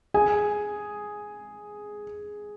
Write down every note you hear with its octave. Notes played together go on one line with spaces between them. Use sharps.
G#4 G#5